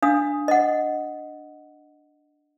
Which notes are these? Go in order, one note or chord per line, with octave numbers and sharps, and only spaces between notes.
D4 F5 D#6
D#5 F#5